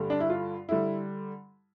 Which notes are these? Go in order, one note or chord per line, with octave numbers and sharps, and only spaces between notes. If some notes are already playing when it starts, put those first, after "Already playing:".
Already playing: G2 D3 G3
D4
E4
F4
D3 G3 E4